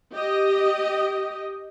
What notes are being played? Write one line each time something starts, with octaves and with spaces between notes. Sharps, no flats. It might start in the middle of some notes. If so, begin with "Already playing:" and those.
G4 D#5